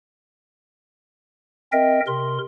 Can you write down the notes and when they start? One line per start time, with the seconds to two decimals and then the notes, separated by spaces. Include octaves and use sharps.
1.72 C4 A#4 D#5 E5 G5
2.07 C3 A#4 C6